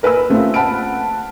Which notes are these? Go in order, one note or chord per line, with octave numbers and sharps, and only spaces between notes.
A#4 B4 G#5 B5 E6
C#3 A3 C4 F4
F#5 A5 B5 F6 D7